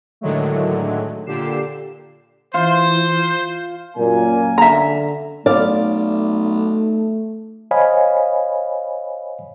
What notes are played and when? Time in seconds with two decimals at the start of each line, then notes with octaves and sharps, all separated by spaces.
0.21 A2 D3 D#3 F#3 G#3 A3
1.27 A#2 D3 G4 C7 E7
2.54 E3 F4 C5
3.97 F#2 A#2 A#3 G#5
4.58 D3 E5 A#5
5.46 B1 A3 D5 F5
7.71 C5 C#5 D#5 F5 G#5 B5